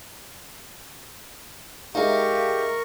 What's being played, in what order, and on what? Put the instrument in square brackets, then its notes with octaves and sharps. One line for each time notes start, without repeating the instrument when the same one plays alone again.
[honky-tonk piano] G#3 D#4 [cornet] G4 [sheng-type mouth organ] A#4 C#6 [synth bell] E5 F5